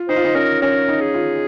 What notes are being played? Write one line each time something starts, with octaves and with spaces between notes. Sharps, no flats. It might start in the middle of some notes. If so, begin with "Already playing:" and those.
Already playing: F4
D#4 C5
F4
D#4
C#4 A#4
C#4 A#4
D#4
G#4
F4